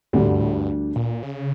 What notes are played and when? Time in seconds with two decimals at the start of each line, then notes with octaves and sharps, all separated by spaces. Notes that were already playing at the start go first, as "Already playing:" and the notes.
0.13 D2 A2 D3 G3 D4
0.27 G2
0.41 A2
0.55 G2
0.96 A#2
1.23 C#3